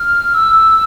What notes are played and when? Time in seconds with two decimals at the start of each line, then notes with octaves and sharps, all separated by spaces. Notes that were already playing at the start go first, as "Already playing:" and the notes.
Already playing: F6
0.34 E6